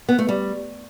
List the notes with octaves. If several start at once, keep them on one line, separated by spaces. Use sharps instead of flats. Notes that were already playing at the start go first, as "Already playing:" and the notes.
B3
A3
G3